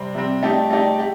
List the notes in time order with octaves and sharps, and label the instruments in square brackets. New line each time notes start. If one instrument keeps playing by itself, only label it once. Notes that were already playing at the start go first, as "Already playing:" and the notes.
Already playing: [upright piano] C3 G3 C4
C3 G3 C4
A3 D#4 G4 D5
A3 D#4 G4 D5
G4